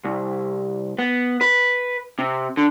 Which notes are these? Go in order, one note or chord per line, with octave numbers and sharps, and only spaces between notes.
C2
B3
B4
C3
D3